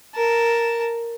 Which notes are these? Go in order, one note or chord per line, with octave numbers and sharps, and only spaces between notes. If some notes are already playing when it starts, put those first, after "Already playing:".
A#4 A5